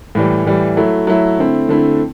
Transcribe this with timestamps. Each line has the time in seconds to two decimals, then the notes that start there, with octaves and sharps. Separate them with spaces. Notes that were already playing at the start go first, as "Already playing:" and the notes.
0.15 A2 E3 G3
0.46 A2 E3 G3
0.77 F#3 A3 E4
1.07 F#3 A3 E4
1.39 D3 A3 C4 E4
1.69 D3 A3 C4 E4